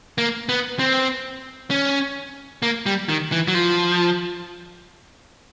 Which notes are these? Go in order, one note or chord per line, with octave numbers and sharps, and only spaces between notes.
A#3
B3
C4
C#4
A#3
G3
D#3
E3
F#3
F3